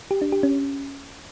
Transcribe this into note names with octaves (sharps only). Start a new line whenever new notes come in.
G4
D4
G4
C#4